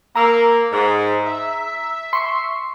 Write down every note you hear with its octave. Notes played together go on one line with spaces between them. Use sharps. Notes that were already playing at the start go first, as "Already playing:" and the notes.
A#3 A#5 E6
G#2
E5
C6 C#6